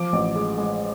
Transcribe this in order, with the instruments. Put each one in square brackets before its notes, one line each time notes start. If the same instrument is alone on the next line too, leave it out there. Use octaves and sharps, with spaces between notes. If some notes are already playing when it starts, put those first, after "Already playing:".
Already playing: [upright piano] F3 D6
A1
G#3
G#3